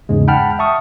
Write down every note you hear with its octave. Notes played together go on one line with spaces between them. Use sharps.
E2 G#2 C#3 G#3
F#5 G5 A5 B5 F6
E5 A5 C#6 D#6